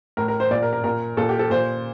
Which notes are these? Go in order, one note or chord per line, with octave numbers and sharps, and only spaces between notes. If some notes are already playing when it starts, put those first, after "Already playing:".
A2 A#4
A#4
C5
A#2 D5
A#4
A#4
A#2 A#4
A#2 A4
G4
A4
A#2 C5